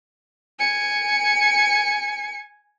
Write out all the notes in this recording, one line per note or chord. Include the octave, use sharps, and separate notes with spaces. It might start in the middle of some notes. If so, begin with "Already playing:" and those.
G#5 C#7